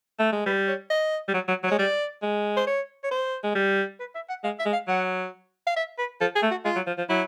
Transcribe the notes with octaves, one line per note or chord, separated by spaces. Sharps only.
A3
G#3
G3 B4
C#5
D#5
G3
F#3
F#3
F#3
G#3 C#5
G3 D5
G#3
C5
C#5
C#5
C5
G#3
G3
B4
E5
F#5
G#3 F5
E5
G#3
F5
F#3 F#5
F5
E5
B4
F3 A4
G#4
A3
F#4
G#3 F4
F#3
F3
F3
F#3 E4